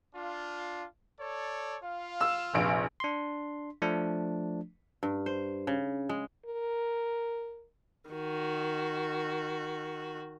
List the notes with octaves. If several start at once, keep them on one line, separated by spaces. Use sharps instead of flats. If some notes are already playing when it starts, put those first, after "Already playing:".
D4 F4
A4 C#5 D5
F4 F5
E6 E7
F1 A#1 D7
D4 C6
F3 A3 D4
G2
C5
C#3
G#3
A#4
D#3 F#4